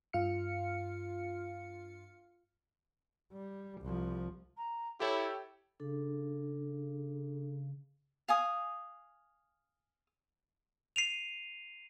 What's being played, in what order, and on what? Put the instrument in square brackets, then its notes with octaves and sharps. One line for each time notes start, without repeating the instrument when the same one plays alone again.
[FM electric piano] G2 F4 F5 F6 C#7
[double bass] G3
C2 F3
[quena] A#5
[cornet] E4 [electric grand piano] G4 A4 C#5 [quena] G5
[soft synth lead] C#3 [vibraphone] D4 A4
[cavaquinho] F5 G#5 D#6
[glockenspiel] C7 D#7 F7